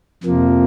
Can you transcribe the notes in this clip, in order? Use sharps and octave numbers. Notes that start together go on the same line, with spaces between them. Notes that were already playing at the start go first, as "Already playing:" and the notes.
F2 C3 F3 A#3